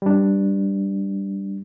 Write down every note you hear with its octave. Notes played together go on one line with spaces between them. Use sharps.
G3 D4